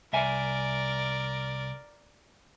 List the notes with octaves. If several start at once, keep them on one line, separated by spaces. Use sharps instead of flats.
C2 A#4 D5 E5 G#5